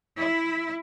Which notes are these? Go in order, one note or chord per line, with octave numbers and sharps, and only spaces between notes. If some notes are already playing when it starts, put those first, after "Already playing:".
E4